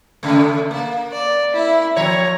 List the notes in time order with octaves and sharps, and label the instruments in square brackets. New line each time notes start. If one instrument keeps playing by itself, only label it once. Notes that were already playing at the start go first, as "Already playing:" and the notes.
[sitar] C#3 A3
A#3
[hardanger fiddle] D5
E4 E5
[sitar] F3 C#5 [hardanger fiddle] A#5